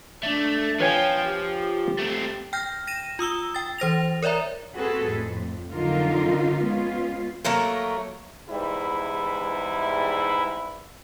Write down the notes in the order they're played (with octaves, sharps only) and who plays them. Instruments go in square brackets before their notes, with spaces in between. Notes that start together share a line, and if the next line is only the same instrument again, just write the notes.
[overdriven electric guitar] A3 [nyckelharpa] D4
[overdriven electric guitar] F3 [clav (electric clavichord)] B4 C#5 G#5 [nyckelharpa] F5 G5
[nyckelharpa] G4
[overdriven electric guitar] A3 C4
[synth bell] G5 F6 G6 A#6
A#6 D#7 E7
F4 D#6 E6 G7
G5 A6
E3 C5 A#6 F7
A#4 C#5 D5 E5 A#5
[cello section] C4 F#4 G#4 A4 B4
F2 A2
F2 D3 F#3 D#4 F4 A#4
G#3 B3 C#4 F4
[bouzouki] F#3 A3 A#3 A#4
[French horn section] E2 G#2 G3 E4 B4